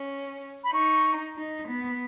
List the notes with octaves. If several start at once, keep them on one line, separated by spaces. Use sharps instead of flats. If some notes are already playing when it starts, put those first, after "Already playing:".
Already playing: C#4
B5
D#4 C#6
D#4
B3